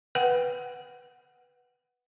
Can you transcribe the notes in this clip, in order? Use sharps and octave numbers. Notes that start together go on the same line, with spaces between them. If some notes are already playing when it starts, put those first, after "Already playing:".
B4 F#5 G5